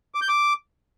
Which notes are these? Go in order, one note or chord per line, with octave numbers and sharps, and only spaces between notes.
D6
G6
D6